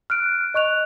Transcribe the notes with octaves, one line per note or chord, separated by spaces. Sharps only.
F6 F#6 D7
D#5 C#6 F#6 F7